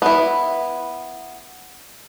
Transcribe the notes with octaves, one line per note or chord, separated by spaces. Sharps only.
B3 E4